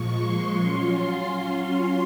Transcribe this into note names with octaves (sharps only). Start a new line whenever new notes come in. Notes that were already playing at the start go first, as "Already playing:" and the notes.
Already playing: A#2 F3 G#3 C#6
C6
F#3 C#4 F4 C6